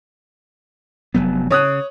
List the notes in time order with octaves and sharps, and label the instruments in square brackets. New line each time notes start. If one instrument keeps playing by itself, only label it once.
[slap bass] F1 F#3 B3
[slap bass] C#3 [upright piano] C#5 D#6 F#6